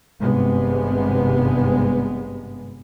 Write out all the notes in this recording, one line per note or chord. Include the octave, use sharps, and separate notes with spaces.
G#1 G2 C3 G#3 B3